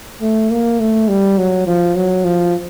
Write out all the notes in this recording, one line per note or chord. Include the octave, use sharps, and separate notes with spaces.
A3
A#3
A3
G3
F#3
F3
F#3
F3